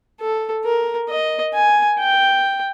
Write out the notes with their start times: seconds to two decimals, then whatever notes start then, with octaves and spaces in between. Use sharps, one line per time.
0.20 A4
0.65 A#4
1.10 D#5
1.54 G#5
1.99 G5